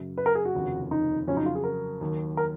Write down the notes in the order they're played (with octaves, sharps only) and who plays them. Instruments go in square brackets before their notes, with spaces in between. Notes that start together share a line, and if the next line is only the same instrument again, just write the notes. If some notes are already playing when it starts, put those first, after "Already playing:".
Already playing: [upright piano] F#2 C#3 F#3
[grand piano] B4
A#4
G#4
F#4
[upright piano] F1 D#2 C#3 F3
[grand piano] D#4
[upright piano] F2 C#3 F#3 [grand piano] C#4
[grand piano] D#4
F4
G#4
A#4
[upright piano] D#2 D#3 F#3
[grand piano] A#4